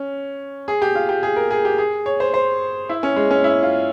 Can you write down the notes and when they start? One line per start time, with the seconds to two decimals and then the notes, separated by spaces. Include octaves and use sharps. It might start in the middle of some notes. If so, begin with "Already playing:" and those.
Already playing: C#4
0.68 G#4
0.82 G4
0.95 F4
1.09 G4
1.23 G#4
1.36 A#4
1.51 G#4
1.65 G4
1.78 G#4
2.06 C#5
2.20 C5
2.34 C5
2.89 E4
3.03 C#4
3.16 G#3
3.31 C#4
3.44 E4
3.63 F4